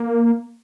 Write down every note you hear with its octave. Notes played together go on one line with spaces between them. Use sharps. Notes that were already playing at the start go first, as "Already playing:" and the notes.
Already playing: A#3